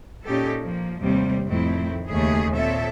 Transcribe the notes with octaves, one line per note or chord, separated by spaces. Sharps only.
A#2 C#4 D#4 G4 A4
F3 A#3
D#2 C3 G3 A3 C4
F2 A2 D#3 A3 C4 E4
D#2 C#3 A3 G#4
A#2 C4 A4 C#5 E5